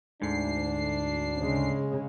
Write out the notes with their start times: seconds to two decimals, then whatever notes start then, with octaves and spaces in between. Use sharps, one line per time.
0.22 D2 G#2 D4 C7
1.39 C#3 G#3